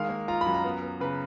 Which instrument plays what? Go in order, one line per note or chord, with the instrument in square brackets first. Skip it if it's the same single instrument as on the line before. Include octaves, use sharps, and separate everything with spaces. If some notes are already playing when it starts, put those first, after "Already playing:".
Already playing: [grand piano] D#3 G#3 F5
A#3
F4 A#5
F#2 B5
A#5
B3
B3
C#3 B4